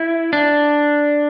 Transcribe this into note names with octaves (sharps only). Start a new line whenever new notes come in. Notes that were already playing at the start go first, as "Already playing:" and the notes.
Already playing: E4
D4